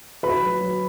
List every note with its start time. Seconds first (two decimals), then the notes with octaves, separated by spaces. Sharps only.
0.23 F#4 B4 B5
0.43 F#3
0.61 F#3